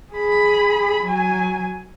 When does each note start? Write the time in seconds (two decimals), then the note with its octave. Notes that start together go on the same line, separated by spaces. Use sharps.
0.14 G#4 B5
1.06 F#3 G#5